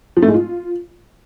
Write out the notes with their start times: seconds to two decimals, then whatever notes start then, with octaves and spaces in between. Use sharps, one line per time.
0.17 F3
0.22 A3
0.28 G#3
0.34 F4